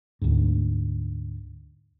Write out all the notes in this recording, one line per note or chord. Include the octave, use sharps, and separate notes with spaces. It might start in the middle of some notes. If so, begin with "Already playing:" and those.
D2 G#2